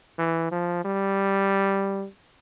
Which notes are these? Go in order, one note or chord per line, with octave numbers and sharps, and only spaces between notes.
E3
F3
G3